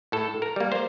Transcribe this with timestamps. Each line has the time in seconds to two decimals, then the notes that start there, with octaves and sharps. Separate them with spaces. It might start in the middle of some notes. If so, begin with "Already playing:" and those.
0.12 A2 A4
0.42 A#4
0.56 G3 A#3
0.72 C5